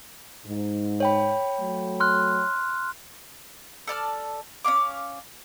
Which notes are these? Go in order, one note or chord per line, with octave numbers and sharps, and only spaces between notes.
G#2
C#5 G5 B5
F#3 A3
C6 F6 F#6
A4 D5 A5 F6
C#4 D#4 F5 D6